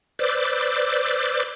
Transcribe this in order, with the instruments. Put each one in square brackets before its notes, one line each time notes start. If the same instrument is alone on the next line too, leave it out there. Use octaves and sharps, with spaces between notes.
[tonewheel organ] B4 C5 D5 D6 E6